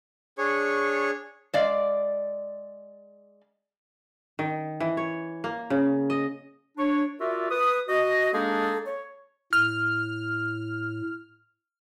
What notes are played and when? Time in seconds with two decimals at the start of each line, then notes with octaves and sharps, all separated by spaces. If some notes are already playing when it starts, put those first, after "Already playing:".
0.38 D4 G#4 C#5 C#6
1.54 G#3 D5 F5
4.39 D#3
4.80 E3
4.97 C#5
5.44 A#3
5.70 C#3
6.10 D#5
6.77 D4 C#5
7.20 F4 F#4 A#4 D5 E5
7.50 B4 D#6
7.88 F#4 D#5
8.32 G#3 A#3 D4 D#4 G#4 A4
8.86 C#5
9.53 A2 F6